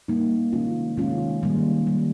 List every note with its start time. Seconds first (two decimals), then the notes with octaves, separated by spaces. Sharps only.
0.08 A#2 G3 A#3 D#4
0.53 C3 D#3 G#3 C#4 F4
0.97 C3 D#3 G#3 C#4 F4
1.43 D#3 G3 A#3
1.86 D#3 G3 A#3